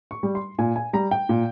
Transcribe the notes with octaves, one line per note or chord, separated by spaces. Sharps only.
C#6
G3
C6
A#2 G#5
G#5
G3 A#5
G5
A#2